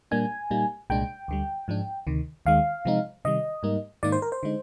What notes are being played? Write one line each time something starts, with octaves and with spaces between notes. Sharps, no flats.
A#2 G3 A#3 D4 G#5
A#2 G3 A#3 D#4
C2 A#2 G#3 D4 G5
D2 D3 G3
G#2 F3 G#3 D4
D2 C3 D#3
D#2 D#3 G#3 F5
C3 F3 G#3 C4 D#4
C3 D#3 G3 D#5
G#2 G3 A#3 D#4
G#2 D#3 A#3 D#4 D5
C5
A#4
C5
D3 G#3 D#4